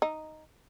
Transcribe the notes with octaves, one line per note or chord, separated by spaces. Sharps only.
D#4